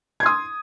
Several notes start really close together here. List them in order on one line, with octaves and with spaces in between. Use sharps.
G#6 C6 D#6